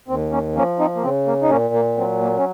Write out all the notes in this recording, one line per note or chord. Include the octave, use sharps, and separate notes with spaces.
D#2 C4
A#3 C#4
F3 A#3 C#4
C4 D#4
A#3
C#3 C4
A#3
D#4
A#2 A#3 C#4
A#3
F#3 C4
A#3
C#4